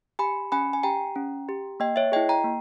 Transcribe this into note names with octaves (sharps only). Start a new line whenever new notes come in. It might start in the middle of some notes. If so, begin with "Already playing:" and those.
G4 G#5 B5
C#4 G#5 B5
G#5
G4 G5 A#5
C#4
G4
A#3 D#5 G5
C#5 E5
E4 G#4 D#5 G5
G5 A#5
A#3